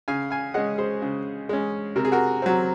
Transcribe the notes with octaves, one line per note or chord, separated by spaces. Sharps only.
C#3 F5 G#5
F5 G#5
G#3 C#4 D#5 F#5
G#4 C5
C#3
G#3 C#4
C3 A#4
G#4
F#4 A#4
F#3 C4